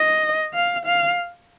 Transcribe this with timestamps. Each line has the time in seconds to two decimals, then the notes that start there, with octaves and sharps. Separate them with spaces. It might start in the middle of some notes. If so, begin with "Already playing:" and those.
Already playing: D#5
0.54 F5
0.85 F5